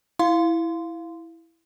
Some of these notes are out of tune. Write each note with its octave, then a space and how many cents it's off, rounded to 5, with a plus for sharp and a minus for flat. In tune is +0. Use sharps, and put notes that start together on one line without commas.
E4 +0 F5 +0 C6 -15